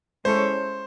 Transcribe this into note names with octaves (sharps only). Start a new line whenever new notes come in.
G#3 C#4 E4 A4 C5 C#5